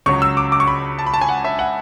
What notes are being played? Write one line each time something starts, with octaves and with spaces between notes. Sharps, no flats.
C#2 C#3 F#3 C#6
E6
D6
D6
C#6
B5
A5
B5
A5
G#5
F#5
E5
F#5